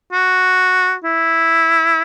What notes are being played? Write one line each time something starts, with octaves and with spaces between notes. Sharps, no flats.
F#4
E4